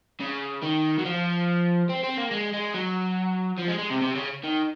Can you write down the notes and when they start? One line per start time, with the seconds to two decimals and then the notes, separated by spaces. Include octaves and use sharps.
0.20 C#3
0.62 D#3
0.98 F#3
1.05 F3
1.89 C4
2.04 C4
2.18 A#3
2.31 G#3
2.54 G#3
2.74 F#3
3.59 F3
3.69 G#3
3.79 G#3
3.91 C3
4.02 C3
4.15 C#3
4.43 D#3